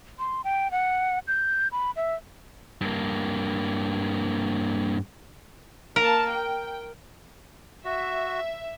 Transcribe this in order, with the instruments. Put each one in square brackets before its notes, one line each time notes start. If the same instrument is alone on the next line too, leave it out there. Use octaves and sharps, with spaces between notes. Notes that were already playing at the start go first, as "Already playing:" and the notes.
[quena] C6
G5
F#5
G6
B5
E5
[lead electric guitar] G2 A#3
[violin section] A#3 A5 [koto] A#4
[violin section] G5
[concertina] F#4 [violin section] E5